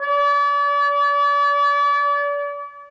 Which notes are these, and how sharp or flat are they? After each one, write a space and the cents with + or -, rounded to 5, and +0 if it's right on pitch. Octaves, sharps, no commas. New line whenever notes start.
D5 -40